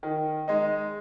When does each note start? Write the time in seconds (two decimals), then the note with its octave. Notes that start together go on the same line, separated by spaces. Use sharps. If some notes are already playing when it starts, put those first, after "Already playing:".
0.03 D#3
0.48 G#3 D#4